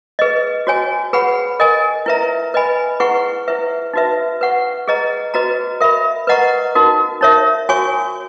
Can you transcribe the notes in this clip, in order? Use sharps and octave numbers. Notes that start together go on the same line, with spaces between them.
G#4 B4 D#5
F#4 C#5 G#5
G#4 B4 F#5 B5
A#4 D#5 G#5
E4 B4 E5 A#5
B4 D#5 G#5 B5
E4 G#4 B4 F#5 C#6
E4 B4 E5
D#4 F#4 B4 E5
B4 F#5 C#6
G#4 B4 D#5 A#5
F#4 B4 D#5 A#5
A#4 E5 B5
B4 D#5 F#5 A#5 C#6
D#4 F#4 A#4
D#4 A#4 C#5 E5
F#4 C#5 G#5 C#6